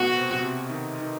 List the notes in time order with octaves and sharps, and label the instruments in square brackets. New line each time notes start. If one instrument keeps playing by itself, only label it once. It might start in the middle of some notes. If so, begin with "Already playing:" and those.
Already playing: [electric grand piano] B2 A3 B3 [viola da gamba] F#4
[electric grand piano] C3 C4
C3 C4
D#3 D#4
D#3 D#4